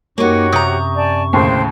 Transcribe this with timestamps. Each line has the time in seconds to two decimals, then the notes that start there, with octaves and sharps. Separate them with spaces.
0.18 F#2 A#3 C#4 D#4 F#4 G4 C#5 C#6
0.52 C3 A#5 D#6 G6
0.96 D5 G#5 A5
1.33 D#2 A2 C#3 C5 G5 C6